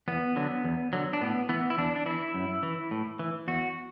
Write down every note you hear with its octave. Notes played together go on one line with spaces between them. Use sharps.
E2 B3
D3 F#3
E2
D3 F#3
D4
A2 B3
E3 B3
E4
E2 D4
D4
E3 E4
F#2
E3
A2
E3
E2 F#4